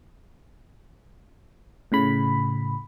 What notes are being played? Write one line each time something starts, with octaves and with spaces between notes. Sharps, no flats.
A2 C#3 B5